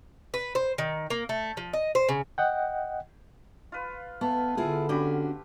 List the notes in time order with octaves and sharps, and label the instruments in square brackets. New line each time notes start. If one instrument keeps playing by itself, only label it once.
[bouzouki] B4
C5
D#3
A#3
A3
F3
D#5
C5
C#3
[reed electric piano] D#5 F#5 G5
[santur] F4 B4
[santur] A3 [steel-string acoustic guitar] B3
[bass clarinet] D3 [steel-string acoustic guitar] E4 F4 G#4
[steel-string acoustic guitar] C#4 D4 F#4 [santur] G4 B5